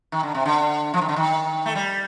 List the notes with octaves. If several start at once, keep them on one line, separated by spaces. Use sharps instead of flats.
D#3
D3
C3
D3
F3
D#3
D3
D#3
A3
G3